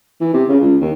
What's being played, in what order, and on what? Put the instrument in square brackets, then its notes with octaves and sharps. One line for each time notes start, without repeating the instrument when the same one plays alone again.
[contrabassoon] E3
C3
C#3
C#2
D#2